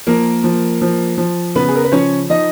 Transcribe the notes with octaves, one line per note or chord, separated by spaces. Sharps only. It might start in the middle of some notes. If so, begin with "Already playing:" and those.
F3 A#3 A#4
F3
F3
F3
C#3 B3 B4
G#4
A#4
B4
F3 C#4 C#5
F3 D#4 D#5